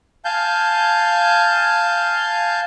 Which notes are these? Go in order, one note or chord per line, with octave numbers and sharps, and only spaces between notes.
F5 G#5 A5 G6